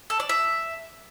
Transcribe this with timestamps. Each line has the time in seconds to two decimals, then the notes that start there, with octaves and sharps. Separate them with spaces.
0.10 A4
0.20 D5
0.29 E5